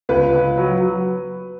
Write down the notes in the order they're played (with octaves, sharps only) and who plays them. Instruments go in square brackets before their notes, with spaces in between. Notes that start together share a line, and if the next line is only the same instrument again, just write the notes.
[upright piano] C#2 [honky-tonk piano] B4
[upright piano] C#2
F#3
F#3